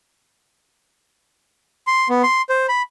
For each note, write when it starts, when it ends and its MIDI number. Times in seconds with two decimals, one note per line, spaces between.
1.87 2.08 84
2.09 2.22 59
2.23 2.42 84
2.49 2.66 72
2.69 2.82 83